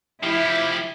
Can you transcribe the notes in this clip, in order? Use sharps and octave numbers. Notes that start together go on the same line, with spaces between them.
F3 E4 G4